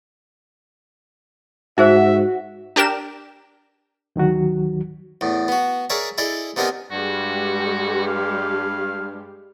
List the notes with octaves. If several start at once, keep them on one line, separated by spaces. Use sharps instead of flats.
G#2 D#4 F#4 G#4 C5 E5
D4 G4 A#4 E7
D2 D#3 F#3 F#4
E2 A2
B3 F#4
G#4 A#4 C#5 D5 E5 A5
E4 G#4 A4 D5 D#5
C3 B3 D4 D#4 A#4 G#5
G2 G3 G#3 F#4 G4
F5